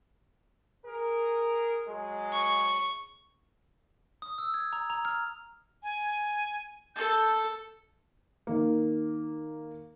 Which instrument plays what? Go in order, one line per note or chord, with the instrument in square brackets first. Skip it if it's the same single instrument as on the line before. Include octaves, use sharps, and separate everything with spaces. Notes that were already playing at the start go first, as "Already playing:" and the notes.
[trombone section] G#4 A#4
F#3 G#3
[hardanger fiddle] C#6
[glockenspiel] D#6
E6
G#6
A#5
A#5
F6
[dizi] G#5
[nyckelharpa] A4 [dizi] G6
[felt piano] D#3 A#3